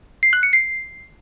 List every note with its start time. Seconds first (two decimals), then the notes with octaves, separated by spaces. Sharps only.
0.23 C7
0.33 F#6
0.43 C#7
0.53 C7